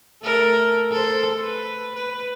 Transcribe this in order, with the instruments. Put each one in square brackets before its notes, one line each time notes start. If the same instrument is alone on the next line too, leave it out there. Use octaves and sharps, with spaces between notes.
[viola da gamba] A3 A4 A#4
A4 C5
B4
B4